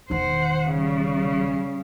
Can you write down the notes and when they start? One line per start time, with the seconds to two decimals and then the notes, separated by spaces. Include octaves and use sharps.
0.10 E1 D#3 C5 F#5
0.70 C#3 G3